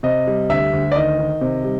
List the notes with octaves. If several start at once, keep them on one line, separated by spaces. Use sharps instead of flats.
C3 D#5
G3
D2 E5
D2
D5
D#3 D#5
D#3
C3
G3